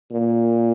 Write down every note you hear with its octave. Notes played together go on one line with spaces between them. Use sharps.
A#2